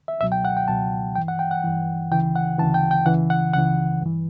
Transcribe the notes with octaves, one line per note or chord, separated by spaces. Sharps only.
E5
C#2 B2 F#3 E5
G5
F#5
G5
C#2 B2 F#3 A5
G2 E3 G5
F#5
G5
F#5
G2 E3
D2 C#3 E3 G5
F#5
D2 C#3 E3 A5
G5
G5
C#2 C#3 E3 F#5
F#5
C#2 C#3 E3 F#5
G2 E3